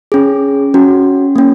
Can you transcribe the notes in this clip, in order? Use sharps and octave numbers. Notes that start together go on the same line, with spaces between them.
C#4 G#4
C#4 F#4
A#3 C#4